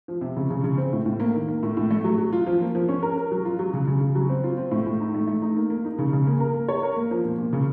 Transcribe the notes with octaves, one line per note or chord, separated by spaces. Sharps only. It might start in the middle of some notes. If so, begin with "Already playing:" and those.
F3
C3
C#3
C#3
C#3
C4
A2
A2
A#3
D#3
A#3
A2
A2
A3
F#3
F#3
F4
F3
A#3
F3
C#4
A#4
A#4
F#3
F4
F#3
C#3
C#3
C#3
F#3
C4
F4
C4
A2
A2
D#4
A3
A3
D#4
A#3
A#3
D#4
C#3
C#3
A#3
A#4
A#3
C#5
A#4
A#3
F3
A#2
A#2
C#3